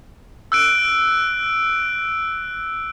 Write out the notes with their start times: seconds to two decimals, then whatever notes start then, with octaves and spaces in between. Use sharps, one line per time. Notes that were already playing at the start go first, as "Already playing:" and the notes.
0.52 E6 F#6 D7